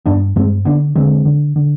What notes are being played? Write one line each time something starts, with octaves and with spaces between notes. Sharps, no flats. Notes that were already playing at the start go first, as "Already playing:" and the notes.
G2 B3 D4
G2 G#3 C4
D3 B3 D4
D3 G#3 C4
D3
D3